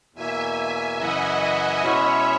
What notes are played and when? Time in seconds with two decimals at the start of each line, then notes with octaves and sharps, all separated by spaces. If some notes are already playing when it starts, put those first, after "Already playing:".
0.14 E2 B2 A#3 E5 G#5
0.98 F#2 C#3 E3 D#5 F#5
1.82 B2 G#3 C#4 E4 C#5 E5